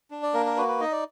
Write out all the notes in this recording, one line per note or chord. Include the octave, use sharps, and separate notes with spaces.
D4
D5
A#3 A#4
A#4
F#4 B4
B4
D#4 D#5
D5